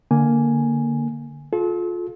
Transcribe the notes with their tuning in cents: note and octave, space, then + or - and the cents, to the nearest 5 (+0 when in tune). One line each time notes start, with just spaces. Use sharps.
D3 -5 A#3 +0 G#5 +0
F4 +20 A4 -40